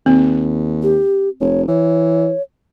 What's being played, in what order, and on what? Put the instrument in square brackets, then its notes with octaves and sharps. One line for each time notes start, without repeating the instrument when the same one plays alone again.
[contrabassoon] D#2 [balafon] C4
[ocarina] G4
[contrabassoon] F1 [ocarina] C#5
[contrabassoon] E3 [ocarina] C#5